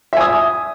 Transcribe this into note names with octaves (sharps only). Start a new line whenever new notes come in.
E5 G#5 D#6